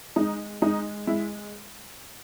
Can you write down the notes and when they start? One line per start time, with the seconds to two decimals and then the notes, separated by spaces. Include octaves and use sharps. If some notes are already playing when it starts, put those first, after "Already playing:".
0.16 G#3 D#4
0.62 G#3 D#4
1.07 G#3 E4